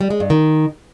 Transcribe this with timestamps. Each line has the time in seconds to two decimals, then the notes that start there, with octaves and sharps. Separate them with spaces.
0.01 G3
0.10 G#3
0.20 G2
0.30 D#3